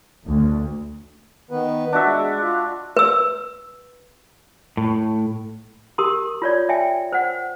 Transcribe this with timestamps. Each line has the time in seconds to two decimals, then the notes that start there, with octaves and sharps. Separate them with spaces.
0.25 D2
1.51 D#3 B3 B4
1.93 D4 F#4 E5
2.05 G#3
2.41 F4
2.97 B4 E6
4.77 A2
5.98 G4 A#4 C6 D#6
6.42 F4 C#5 D5
6.69 E5 G5 G#5
7.13 C5 F#5